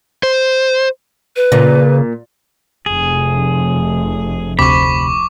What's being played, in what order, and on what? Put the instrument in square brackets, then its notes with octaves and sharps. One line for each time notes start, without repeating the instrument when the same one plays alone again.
[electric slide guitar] C5
[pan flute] B4
[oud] A#2 [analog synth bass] C#3
[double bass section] F1 [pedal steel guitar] G#4
[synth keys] D2 C3 [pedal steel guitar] B5 [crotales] C#6 D6